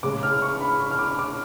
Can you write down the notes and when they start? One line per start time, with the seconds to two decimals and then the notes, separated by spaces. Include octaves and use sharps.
0.03 C#3 G#3 D6
0.23 F6
0.42 C#6
0.61 B5
0.80 C#6
0.91 F6
0.99 D6
1.19 D6